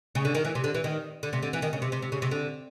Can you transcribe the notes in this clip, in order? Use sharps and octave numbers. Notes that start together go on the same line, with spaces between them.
C#3
D3
D#3
E3
C3
D3
E3
D#3
D3
C3
D3
E3
D#3
C#3
C3
C3
C3
C#3
C3
D3